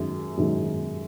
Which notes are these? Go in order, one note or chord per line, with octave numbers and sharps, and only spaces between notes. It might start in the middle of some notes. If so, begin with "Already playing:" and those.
Already playing: F#2 D#3 G#3
F#2 D#3 G#3